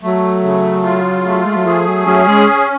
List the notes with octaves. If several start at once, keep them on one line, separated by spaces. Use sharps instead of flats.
F#3 A3
C#3
F4
A3
G#3
F#3
F3 G#4
F#3
F#3 C#4
G#3